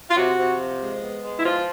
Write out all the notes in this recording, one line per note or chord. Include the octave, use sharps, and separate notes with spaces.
F4
C3 F#4
C3
F3
G#3
B3
G#3
E4
F3 F4